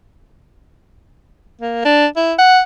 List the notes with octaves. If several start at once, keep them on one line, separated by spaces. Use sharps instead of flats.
A#3
D4
E4
F#5